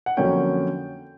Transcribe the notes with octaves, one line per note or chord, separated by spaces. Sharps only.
F#5
F2 D3 F#3 A#3 C#4 G5